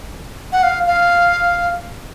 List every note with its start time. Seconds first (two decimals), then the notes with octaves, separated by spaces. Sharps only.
0.52 F#5
0.63 F5
0.87 F5